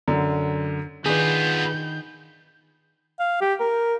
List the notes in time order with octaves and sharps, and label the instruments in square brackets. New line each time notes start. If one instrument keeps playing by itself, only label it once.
[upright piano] F#2 D3
[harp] D#3 D4 D#4 [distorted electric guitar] B3 F4 [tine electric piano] G#4 B4 [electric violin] G6
[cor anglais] F5
G4
A#4